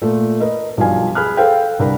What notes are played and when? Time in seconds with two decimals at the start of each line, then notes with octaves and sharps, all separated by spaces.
0.02 A#2 A3
0.40 A#4 B4 D#5
0.77 B1 G2 F3 F5 G#5
1.15 G#4 B5 F6 F#6
1.37 A4 C5 F5 G5
1.79 C2 D4 A#4 B5